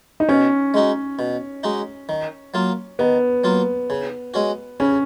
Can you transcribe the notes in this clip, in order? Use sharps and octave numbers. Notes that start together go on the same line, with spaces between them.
D#4
B2 C#4
G#3 D#4 F#4
B2
G#3 D#4 F#4
D#3
F#3 A#3 F4
D#3 B3
F#3 A#3 F4
C#3
G#3 C#4 F#4
C#3 C#4